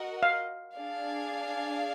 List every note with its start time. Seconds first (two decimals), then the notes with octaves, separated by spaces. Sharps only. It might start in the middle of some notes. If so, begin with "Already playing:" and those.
Already playing: F#4 A#4 D#5 F#5
0.23 F5
0.76 D4 G#4 D5 F5